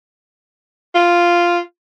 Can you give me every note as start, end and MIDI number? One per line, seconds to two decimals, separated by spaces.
0.95 1.59 65